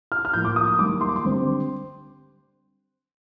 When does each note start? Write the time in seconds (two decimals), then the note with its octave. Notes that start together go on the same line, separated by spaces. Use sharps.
0.12 F6
0.25 F6
0.34 A2 F3 A#3 G6
0.45 D6
0.56 D#6
0.67 D#6
0.78 D#3 G3 A#3 D6
1.01 C6
1.09 D6
1.16 C6
1.24 D3 G3 C4